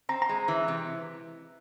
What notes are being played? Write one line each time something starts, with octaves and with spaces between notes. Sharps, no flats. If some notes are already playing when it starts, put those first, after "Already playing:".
C4 A#5
A#5
G#3
E3
C3